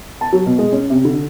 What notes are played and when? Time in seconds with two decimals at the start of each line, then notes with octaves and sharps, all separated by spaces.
0.21 A5
0.32 F#3
0.46 B2
0.58 G#3
0.72 C#4
0.90 C3
1.05 D3